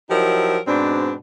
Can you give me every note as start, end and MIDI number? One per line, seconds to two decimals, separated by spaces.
0.10 0.58 53
0.10 0.58 54
0.10 0.58 63
0.10 0.58 64
0.10 0.58 67
0.10 0.58 70
0.67 1.14 44
0.67 1.14 47
0.67 1.14 60
0.67 1.14 62